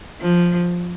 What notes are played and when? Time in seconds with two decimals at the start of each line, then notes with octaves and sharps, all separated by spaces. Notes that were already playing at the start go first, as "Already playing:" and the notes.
0.21 F3